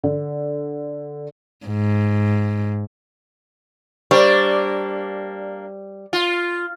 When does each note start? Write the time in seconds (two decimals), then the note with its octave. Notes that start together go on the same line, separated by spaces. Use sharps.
0.03 D3
1.67 G#2
4.11 G3 A#3 D4 C5 C#6
6.13 F4